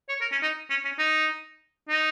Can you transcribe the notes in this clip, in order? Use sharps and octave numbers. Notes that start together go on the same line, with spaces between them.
C#5
A#4
C#4
D#4
C#4
C#4
D#4
D#4